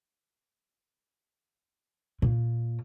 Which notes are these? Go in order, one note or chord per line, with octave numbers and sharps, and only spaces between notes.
A#2